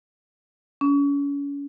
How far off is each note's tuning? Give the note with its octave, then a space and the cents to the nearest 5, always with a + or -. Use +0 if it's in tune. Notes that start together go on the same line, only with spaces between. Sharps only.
C#4 +35